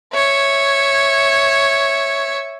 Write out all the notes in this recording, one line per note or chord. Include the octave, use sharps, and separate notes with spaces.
C#5 E5